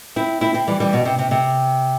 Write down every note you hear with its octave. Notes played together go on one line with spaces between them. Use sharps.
C4 E4
C4 E4
C4 E4
E3 G3
E3 G3
B2
C3
C3
C3